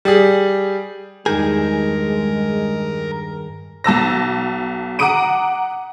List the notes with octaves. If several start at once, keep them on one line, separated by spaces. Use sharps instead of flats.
G3 G#4
E2 G2 D#3 G#3 D#4 G#4 A#4 G6
B1 A5 E6 A#6
F#5 A#5 D6 D#6 D7 D#7